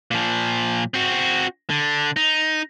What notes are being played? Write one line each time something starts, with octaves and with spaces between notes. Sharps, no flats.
A#2 F3
C4 F#4
D3
D#4